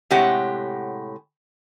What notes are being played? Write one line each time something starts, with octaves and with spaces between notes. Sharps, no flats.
A2 C3 G#3 G4 C#5 F#5